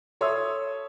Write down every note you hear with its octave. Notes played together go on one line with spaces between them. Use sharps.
A4 C#5 E5 C6 D#6 E6